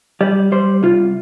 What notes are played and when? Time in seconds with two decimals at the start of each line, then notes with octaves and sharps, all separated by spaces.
0.21 G3 D5
0.52 G3 C5
0.83 C2 F4